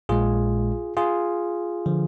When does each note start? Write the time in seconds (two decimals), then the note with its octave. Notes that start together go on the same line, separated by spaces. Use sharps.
0.09 A#1 A#2 G#3 F4 G#4
0.97 F4 G#4
1.86 D3 F3